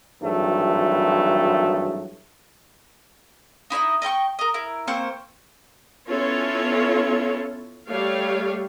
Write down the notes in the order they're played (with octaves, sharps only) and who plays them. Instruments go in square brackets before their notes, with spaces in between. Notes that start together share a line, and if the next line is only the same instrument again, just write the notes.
[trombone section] G#1 G2 E3 F#3 G#3 A3
[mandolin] D#4 E4 C#5 D#5
D#5 E5 G5 C#6
A#4 D#5
E4 A#4
A#3 C4 C5 C#6
[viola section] B3 C#4 E4 F4 A4 C#5
G3 A3 G4 C#5 F5